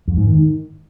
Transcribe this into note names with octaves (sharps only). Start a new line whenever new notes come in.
F2
G#2
D#3